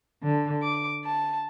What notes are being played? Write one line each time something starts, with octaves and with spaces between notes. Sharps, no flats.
D3
D6
A5